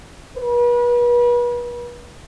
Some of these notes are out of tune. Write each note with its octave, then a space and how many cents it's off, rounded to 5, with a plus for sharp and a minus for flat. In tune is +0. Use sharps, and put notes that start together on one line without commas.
B4 -35